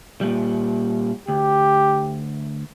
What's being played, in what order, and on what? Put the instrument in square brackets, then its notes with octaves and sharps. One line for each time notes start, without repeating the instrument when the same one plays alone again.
[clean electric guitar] A#2 G3
[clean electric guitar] D2 [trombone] G4